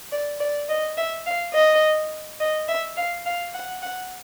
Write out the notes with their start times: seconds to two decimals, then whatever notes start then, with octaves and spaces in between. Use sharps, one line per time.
0.12 D5
0.40 D5
0.69 D#5
0.97 E5
1.26 F5
1.54 D#5
2.40 D#5
2.68 E5
2.97 F5
3.26 F5
3.54 F#5
3.82 F#5